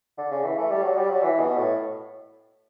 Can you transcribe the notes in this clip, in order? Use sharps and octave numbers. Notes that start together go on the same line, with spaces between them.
D3
C#3
E3
A3
G3
F#3
G3
F#3
E3
B2
A2